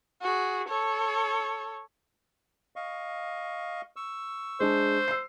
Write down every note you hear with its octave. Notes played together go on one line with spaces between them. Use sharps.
F#4 G#4
A4 C#5
D#5 F5 C#6
C#6 E6
G#3 D4 C5
E6 C7